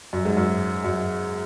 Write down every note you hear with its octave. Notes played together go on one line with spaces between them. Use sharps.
F#2
G#2
F#2
F#2